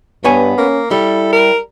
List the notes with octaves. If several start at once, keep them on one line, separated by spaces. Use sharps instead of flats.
G2 B3 C#5 G#5
A#3 C#4
G3 E4 A4
A#4